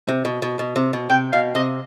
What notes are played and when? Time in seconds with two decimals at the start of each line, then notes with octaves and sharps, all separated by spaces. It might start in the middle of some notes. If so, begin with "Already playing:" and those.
0.08 C3
0.25 B2
0.42 B2
0.59 B2
0.76 C3
0.93 B2
1.09 C3 G5
1.32 B2 F5
1.55 C3 D#5